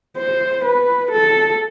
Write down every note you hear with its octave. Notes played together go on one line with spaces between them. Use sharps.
C5
B4
A4